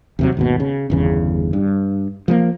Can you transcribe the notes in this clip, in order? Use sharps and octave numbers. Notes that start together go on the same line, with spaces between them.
D#2 C3 F#3
G#1 D#2 B2
C#3
G1 E2 C#3
G2
F3 G3 A#3